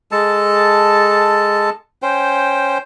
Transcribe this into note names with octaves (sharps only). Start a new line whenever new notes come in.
G#3 A4 A5
C#4 C5 G5